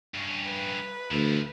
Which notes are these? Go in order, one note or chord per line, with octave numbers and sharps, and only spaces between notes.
G2 C#4
B4
D2 F3 E4